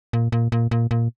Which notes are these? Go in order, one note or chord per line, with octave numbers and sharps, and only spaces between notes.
A#2
A#2
A#2
A#2
A#2